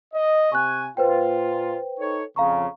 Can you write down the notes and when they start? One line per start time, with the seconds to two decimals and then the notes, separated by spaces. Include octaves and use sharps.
0.14 D#5
0.52 C3 G#5 C#6 F#6
0.97 A#2 F4 B4 C5 G5
1.99 D#4 A4 C#5
2.36 F2 C#3 F5 A#5 C#6